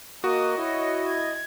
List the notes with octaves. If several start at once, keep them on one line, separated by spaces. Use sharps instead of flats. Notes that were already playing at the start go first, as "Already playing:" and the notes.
A#3 F#4 D#5 D#6
E4 C#5
G#6